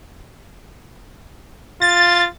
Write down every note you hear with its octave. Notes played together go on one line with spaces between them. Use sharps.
F4 A6